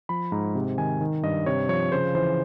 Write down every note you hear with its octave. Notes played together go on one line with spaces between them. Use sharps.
F3 B5
G#2 A#5
C3
D#3 G#5
D#3
G2 D#5
C3 C#5
F3 C#5
C#3 C5
E3 C5